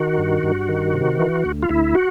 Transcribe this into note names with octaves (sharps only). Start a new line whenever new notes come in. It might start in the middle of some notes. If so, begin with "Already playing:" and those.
Already playing: D#3 F#4
G2
G2
D#3
C3
E3
D2
F4
D2 E4
F#4